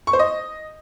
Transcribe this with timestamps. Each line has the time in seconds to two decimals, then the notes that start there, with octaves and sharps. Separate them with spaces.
0.07 C#6
0.13 C5
0.19 D#5